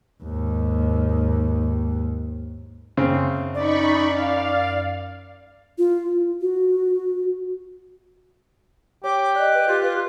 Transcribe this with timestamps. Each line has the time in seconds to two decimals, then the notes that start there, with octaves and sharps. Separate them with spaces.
0.24 D#2 G#2
2.97 F#2 C#3 C4
3.55 D#4 D5 B5 C#6
4.12 F5
5.78 F4
6.42 F#4
9.04 G4 C#5 D6
9.35 D5 D#5 F#6
9.54 B4
9.68 F4 G4
9.82 F4 B4